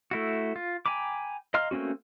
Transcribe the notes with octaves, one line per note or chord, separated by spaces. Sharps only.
A3 E4 F#4
F4
G5 G#5 A#5 B5 D6
D#5 F5 A#5 C6 F6
A3 A#3 C4 C#4 F#4